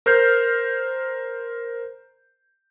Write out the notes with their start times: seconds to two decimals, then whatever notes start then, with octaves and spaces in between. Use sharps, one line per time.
0.06 A#4 C5 F6 G6 C7